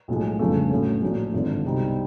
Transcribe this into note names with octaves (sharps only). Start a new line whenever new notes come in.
B1 A2 F3 G#3
G1 F2 C#3 F3 A3
A2 F#3 A3 C#4
A#1 A2 F#3 A3
G#1 G2 D3 F3
C2 B2 G3 C4 D#4